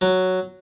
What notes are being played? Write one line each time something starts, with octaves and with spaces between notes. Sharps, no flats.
F#3